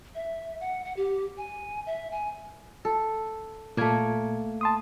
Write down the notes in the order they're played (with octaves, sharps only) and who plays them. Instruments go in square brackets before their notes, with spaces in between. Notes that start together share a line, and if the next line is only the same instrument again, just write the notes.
[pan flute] E5
F#5
F#5
G4
G#5
E5
G#5
[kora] A4
[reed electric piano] A#2 G#6 [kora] A3 A#3
[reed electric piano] A5 C6 D#6